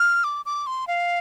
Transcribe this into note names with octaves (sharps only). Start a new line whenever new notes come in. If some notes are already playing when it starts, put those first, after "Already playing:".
Already playing: F6
D6
D6
C6
F5